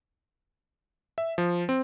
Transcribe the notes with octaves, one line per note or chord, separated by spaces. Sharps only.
E5
F3
C4